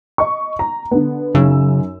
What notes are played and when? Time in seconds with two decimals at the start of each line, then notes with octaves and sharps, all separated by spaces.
0.18 D#5 C#6
0.59 A#5
0.91 D3 B3
1.35 F#2 C#3 D#4 E6